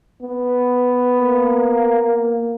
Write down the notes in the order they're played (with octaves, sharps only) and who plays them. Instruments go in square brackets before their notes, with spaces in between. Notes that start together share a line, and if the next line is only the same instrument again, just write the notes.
[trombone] B3
[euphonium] A#3